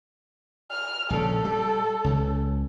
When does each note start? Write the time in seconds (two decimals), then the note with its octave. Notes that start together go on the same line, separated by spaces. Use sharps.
0.71 F6
1.10 A#1 C#3 A4
1.45 G3
2.04 C#2 C#3